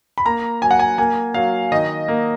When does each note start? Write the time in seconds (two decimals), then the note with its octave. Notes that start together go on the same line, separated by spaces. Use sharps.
0.18 B5
0.25 A#3 A#5
0.62 F#3 G#5
0.71 F#5
0.79 G#5
0.98 A#3 G#5
1.34 F#3 F5
1.72 D#3 D#5
2.08 A#3